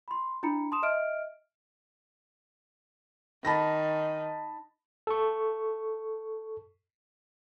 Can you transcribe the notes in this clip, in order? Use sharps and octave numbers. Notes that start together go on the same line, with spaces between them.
B5 C6
D4 E4 A#5 B5 C#7
A5 C6 D#6 E7
D#5 E5 F6 D7
D#3 A5 B5 A#6
A4 C#6